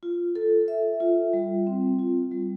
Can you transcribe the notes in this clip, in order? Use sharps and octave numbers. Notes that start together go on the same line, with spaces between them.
F4
A4
E5
F4
G3
C4
F4
G3